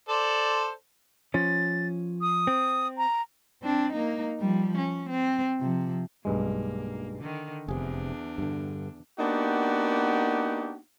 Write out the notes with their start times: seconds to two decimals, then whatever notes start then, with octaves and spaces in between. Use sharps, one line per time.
0.09 A4 C5 D5
1.34 F3 C#4 A6
2.21 D#6
2.47 C4
2.98 A#5
3.63 C4 D4
3.93 A#3 D#4
4.40 F3 G3
4.78 C#4
5.10 C4
5.61 C3 F3
6.25 B1 G2 G#3 A#3
7.18 D3 D#3
7.68 F1 E2 C3 D4 G#4
8.38 G2 D3
9.19 A#3 B3 D4 D#4 F#4 G4